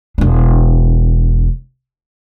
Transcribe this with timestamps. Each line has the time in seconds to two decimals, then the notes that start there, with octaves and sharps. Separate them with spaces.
0.18 E1 D4